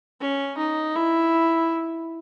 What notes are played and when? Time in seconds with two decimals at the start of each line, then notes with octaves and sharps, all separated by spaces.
0.21 C#4
0.58 D#4
0.95 E4